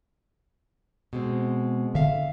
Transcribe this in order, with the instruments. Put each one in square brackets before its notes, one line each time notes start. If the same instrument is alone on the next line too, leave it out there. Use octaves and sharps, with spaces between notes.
[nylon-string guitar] B2 G#3 C4
[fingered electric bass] D3 [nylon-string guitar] E5 F5